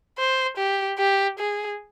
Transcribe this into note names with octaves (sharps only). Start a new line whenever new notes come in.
C5
G4
G4
G#4